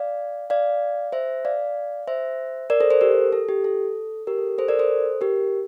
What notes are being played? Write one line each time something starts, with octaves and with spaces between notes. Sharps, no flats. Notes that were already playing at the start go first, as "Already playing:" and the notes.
Already playing: D5 F5
D5 F5
C5 E5
D5 F5
C5 E5
A#4 D5
A4 C5
A4 C5
G4 A#4
A4
G4
A4
G4 A#4
A4
A4 C5
A#4 D5
A4 C5
G4 A#4